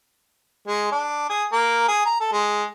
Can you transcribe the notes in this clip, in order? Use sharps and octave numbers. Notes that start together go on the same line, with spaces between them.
G#3
D4
G#4
A#3
G#4
A#5
A4
G#3